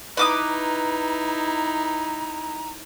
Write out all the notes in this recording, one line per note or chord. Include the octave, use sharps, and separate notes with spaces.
D#4 E4 B4 A#5 D6 D#6